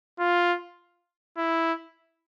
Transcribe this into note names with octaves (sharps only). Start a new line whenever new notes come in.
F4
E4